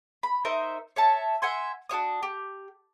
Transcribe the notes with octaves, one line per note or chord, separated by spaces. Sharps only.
B5
D#4 A#4 C5 E5
C#5 E5 A5
E5 F#5 G#5 C6
D4 F#4 C#5 D#6
G4